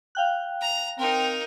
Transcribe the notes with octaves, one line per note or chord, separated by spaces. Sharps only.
F5 G5 F#6
A#5
C4 D#4 A#4